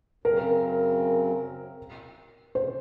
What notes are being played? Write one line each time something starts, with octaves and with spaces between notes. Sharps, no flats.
F#2 C#3 F#3 C4 A#4
C5